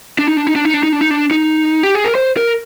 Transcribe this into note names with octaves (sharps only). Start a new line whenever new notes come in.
D4
D#4
D4
D#4
D4
D#4
D4
D#4
D4
D#4
D4
D#4
G4
G#4
A#4
C5
A#4